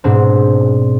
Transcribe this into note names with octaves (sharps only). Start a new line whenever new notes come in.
G#2 B2 C4 D4